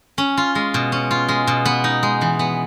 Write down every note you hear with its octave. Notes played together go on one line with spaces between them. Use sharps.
C#4
F4
G#3
B2
C#4
F4
G#3
B2
B3
D#4
G#3
E3
B3